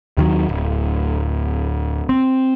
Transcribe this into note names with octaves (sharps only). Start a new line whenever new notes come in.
D#2 D#3 F#3
D1
C4